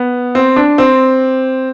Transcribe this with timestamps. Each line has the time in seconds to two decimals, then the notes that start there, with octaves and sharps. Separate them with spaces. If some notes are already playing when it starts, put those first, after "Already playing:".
Already playing: B3
0.35 C4
0.56 D4
0.78 C4